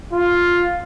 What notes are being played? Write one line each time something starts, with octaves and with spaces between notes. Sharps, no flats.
F4